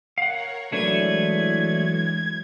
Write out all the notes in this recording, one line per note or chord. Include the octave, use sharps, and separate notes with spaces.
A#4 C#5 F5 F#5
E3 F#3 G#3 A3 D4 B4 G#6